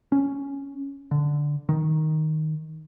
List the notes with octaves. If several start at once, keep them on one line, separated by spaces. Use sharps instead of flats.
C#4
D3
D#3